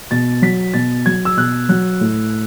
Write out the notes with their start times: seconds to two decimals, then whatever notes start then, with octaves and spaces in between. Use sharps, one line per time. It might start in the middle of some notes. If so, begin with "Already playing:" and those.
0.11 B2 A6
0.42 F#3 B6
0.74 B2 A6
1.06 F#3 G#6
1.25 E6
1.37 B2 F#6
1.69 F#3 F#6
2.01 A2